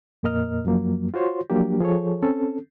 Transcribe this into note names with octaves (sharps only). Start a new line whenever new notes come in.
F2 A#2 A#3 A#4 D#5 F6
F#2 F3 F#3 A#3
F4 F#4 C5 C#5 C6
F3 F#3 A#3 D4 G4
F3 G#4 A4 C#5
C4 C#4 A4